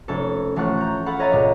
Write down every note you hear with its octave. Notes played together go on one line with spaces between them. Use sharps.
F1 C#4 A4
A1 A3 F4 F#5 C#6 F#6
A#5 G6
F4 A4 F#5 B5
C#5 D#5 E5 A#5 C6 A6
C#2 A#2